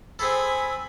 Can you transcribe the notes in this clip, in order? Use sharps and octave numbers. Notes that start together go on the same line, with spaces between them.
C4 G#4 A4 G#5 B5